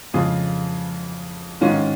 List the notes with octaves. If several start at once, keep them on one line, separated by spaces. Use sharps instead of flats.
F2 C#3 F3 G#3 F4 G#4
G#2 D#3 G#3 C#4 F4